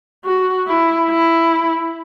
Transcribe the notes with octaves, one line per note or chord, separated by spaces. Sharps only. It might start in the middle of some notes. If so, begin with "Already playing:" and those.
F#4
E4
E4